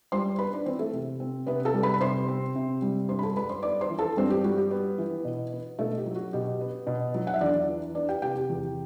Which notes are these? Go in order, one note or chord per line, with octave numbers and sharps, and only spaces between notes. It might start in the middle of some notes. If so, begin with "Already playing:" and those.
G3 C5 C6
B3 B4 B5
D4 D5
E3 C4 C5
A3 A4
C3
C4
C3 B3 B4
A4 A5
G3
B4 B5
B5
C3 C5 C6
C4
C3
G3
G2 C5 C6
B5
A4 A5
G3 B4 B5
C5 C6
B3 D5 D6
C5 C6
E3
A4 A5
G2 C4 C5
G4
G3 F#4
G4
B3
E3
B2
B3
B2 A3 A4
G4
F#3
F#4
B2 G4
B3
B2
F#3
F#5
E5
E2 D4 D5
E3
B3 D4 D5
G4 G5
C3 G4 G5
G4 G5
E2